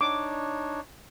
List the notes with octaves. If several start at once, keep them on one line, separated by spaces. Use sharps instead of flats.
D4 D#4 C#5 D6